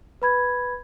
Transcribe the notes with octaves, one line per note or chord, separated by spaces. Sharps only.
B4 B5 G#6